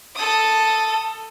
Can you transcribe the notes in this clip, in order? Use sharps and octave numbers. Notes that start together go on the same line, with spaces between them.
A4 D#6